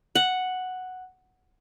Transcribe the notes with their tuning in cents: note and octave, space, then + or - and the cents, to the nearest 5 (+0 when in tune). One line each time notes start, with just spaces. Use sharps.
F#5 +0